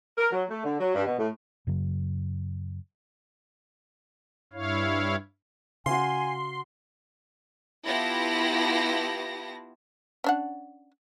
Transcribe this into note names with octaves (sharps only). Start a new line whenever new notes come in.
A#4
F#3
A3
D3
F#3
G2
B2
A2
F#2 C#3 F#3
G2 E4 C#5 F5
C#3 F#4 F5 G#5 C6
B3 E4 F4 G4 A5 A#6
C#4 D4 F#5